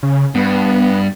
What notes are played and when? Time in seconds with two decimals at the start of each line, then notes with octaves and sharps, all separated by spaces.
0.03 C#3
0.35 G2 B3